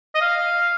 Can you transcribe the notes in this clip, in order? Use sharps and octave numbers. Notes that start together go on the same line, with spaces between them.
D#5
F5